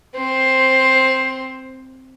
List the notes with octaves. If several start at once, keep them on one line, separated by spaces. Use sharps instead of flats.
C4 C5